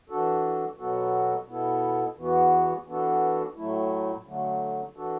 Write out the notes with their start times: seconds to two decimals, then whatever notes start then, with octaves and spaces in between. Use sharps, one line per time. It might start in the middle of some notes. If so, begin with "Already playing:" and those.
0.09 E3 D4 F#4 A4
0.79 B2 F#3 B3 F#4 A4
1.48 B2 B3 E4 A4
2.17 E2 E3 B3 F#4
2.87 E3 B3 D4 F#4 A4
3.56 A2 F#3 A3 E4
4.27 D3 F#3 A3
4.96 E3 D4 F#4 A4